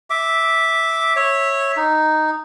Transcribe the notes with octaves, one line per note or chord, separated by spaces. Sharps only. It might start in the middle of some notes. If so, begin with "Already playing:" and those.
E5 D6
C#5 E5
D#4